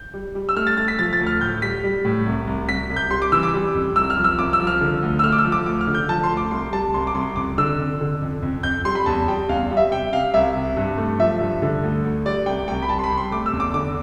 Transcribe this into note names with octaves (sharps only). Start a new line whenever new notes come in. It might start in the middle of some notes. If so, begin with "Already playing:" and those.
Already playing: G6
G3
G3
E6
A3 F6
A6
A3 A6
B6
F3 A6
A6
D2
F6
A2 G6
G3 B6
G3
A2
C2
C2
C2 B6
C2
G6
G3 C6
D6
E3 E6
D6
G3
F2
C2 E6
F6
F3
E6
C2 D6
E6
F3
F6
D3
D2
E6
A3 F6
D6
E6
F3
D6
D2 D6
F6
D3
G6
F3 A5
C6
D2
D6
C2 C6
G3 A5
C2 C6
D6
C2 C6
F2 D6
D3 E6
F2
D3
F2
F2
F2 G6
G3 C6
B5
E2 A5
G3 G5
E2 F5
G3
E5
C3 G5
C3 F5
C2 E5
C3
G2
A3
F3 E5
G2
D3
D2
D2
G3 D5
C2 G5
C2 G5
B5
G3 A5
C6
B5
C3
C6
A3 D6
E6
E2
D6
D3 D6